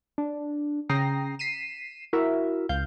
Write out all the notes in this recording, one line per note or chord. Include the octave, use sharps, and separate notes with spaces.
D4
C#3 G5 A#5 D#6 A#6 C7
B6 C7 D#7 E7
E4 F#4 A#4 E5
C#2 F5 G6